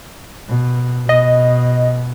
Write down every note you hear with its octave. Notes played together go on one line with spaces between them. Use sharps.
B2
B2 D#5